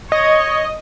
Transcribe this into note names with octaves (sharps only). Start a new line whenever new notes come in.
C#5 D#5